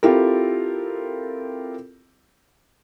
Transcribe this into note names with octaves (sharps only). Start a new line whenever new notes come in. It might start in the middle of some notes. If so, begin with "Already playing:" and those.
C4 E4 F4 G4 A4 A#4